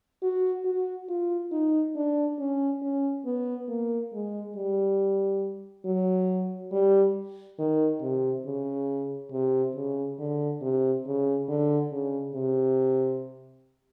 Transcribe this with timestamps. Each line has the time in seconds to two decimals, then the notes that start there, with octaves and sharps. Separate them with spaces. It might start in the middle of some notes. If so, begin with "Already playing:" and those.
0.23 F#4
0.65 F#4
1.09 F4
1.52 D#4
1.95 D4
2.39 C#4
2.82 C#4
3.25 B3
3.68 A#3
4.13 G#3
4.56 G3
5.85 F#3
6.72 G3
7.59 D#3
8.02 C3
8.45 C#3
9.32 C3
9.75 C#3
10.19 D3
10.62 C3
11.06 C#3
11.48 D3
11.92 C#3
12.35 C3